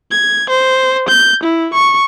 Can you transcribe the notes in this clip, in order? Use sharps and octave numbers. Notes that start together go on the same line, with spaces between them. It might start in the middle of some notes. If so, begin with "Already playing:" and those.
G#6
C5
G6
E4
C#6